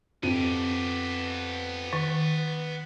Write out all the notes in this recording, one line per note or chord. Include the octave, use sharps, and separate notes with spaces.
F2 B3 G4 D#7
D#3